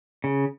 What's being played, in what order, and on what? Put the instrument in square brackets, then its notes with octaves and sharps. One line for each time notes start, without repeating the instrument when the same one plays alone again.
[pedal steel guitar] C#3